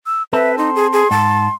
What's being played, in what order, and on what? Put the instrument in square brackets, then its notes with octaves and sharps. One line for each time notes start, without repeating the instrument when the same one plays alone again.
[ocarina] E6
[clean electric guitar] C4 A4 [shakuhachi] B4 [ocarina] E5
[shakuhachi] D#4 [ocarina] C6
[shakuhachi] G#4
G#4
[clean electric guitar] G#2 [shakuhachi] A5